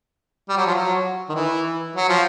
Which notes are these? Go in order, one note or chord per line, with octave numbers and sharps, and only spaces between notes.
G3
F#3
F3
F#3
D#3
E3
F#3
F3